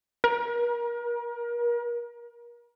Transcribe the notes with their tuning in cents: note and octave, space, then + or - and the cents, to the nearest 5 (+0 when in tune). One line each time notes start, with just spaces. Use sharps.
A#4 +35